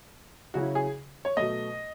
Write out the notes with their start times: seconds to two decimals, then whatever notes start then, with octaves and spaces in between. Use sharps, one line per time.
0.54 C#3 F#3 C#4 E4 F#4
0.75 G#4
1.25 C#5
1.37 B2 F#3 A3 D#5